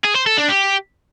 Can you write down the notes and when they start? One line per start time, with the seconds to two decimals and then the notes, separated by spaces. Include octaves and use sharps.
0.04 G#4
0.15 C5
0.27 A4
0.38 D4
0.49 G4